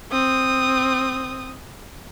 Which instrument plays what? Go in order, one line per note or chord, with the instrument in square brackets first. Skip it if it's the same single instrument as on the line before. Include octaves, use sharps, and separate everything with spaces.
[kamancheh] C4 D#6